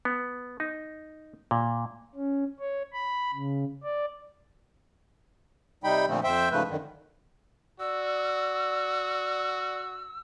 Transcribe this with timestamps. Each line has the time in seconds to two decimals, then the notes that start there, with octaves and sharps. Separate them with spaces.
0.05 B3
0.60 D#4
1.51 A#2
2.15 C#4
2.59 C#5
2.93 B5
3.34 C#3
3.83 D5
5.84 C3 G3 D#4 G5 B5
6.08 A#2 D3 F3 A3 C4
6.24 F2 C5 E5 G5
6.51 G#2 C#3 F3 A3 B4
6.68 F#2 D3 D#3
7.80 F#4 D5 E6